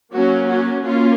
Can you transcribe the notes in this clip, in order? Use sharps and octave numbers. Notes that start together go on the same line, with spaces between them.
F#3 A#3 C#4 F#4
F#4
A#3 C#4 F4